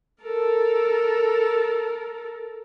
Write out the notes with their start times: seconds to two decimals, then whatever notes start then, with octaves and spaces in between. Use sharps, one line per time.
0.22 A4 A#4